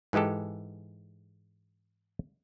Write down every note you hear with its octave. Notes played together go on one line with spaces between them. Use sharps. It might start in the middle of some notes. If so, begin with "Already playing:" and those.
G#2 E3 G#3 G4 A4